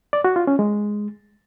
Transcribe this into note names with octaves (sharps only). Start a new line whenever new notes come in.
D5
F#4
F4
C#4
G#3